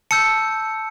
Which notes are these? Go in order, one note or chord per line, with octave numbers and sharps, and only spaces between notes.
A5 E6 G6 C#7